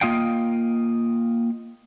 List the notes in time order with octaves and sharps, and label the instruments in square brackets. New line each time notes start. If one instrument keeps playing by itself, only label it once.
[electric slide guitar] A#3 F4 D#5 F5 G5